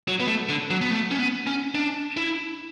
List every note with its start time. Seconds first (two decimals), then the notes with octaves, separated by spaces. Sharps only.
0.08 F#3
0.20 B3
0.28 A3
0.49 D3
0.70 F#3
0.81 B3
0.91 A3
1.11 C#4
1.19 B3
1.47 C#4
1.75 D4
2.17 E4